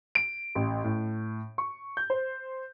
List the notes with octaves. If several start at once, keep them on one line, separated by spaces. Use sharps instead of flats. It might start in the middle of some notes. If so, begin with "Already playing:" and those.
D7
A1
A2
C#6
G6
C5